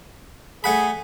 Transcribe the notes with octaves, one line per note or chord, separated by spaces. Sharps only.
A3 G#4 F#5 B5